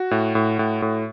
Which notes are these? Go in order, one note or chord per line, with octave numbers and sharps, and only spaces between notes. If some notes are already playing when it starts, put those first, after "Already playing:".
Already playing: F#4
A2
A2
A2
A2